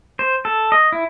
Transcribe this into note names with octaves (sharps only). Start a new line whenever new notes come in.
C5
A4
D#5
E4